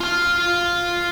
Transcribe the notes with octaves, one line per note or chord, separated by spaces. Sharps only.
F4 F5